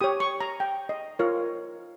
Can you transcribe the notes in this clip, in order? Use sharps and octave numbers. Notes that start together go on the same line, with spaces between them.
G4 C#5 D#6
C#6
A#5
G5
D#5
F4 A#4 C#5